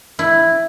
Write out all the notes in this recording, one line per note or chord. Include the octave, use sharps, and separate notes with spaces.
E4